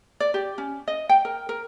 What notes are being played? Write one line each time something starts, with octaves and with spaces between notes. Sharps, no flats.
D5
G4
C#4
D#5
G5
A#4
A#4